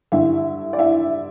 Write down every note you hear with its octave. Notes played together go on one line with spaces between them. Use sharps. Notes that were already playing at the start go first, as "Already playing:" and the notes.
G2 D3 G3 E4 E5
D5
E4 E5